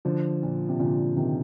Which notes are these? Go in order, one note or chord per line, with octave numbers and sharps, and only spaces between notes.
D3 F3
A#2
C3
A#2 D3
C3 D#3